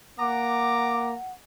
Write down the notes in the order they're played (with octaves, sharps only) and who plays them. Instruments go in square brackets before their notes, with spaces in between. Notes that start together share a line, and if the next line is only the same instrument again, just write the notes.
[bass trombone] A#3 [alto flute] F#5 [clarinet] A#5 [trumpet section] D6